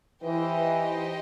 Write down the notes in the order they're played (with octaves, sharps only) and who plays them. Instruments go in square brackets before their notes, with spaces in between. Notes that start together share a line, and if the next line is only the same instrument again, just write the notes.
[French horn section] E3 [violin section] D#4 G4 C5 D#5 G5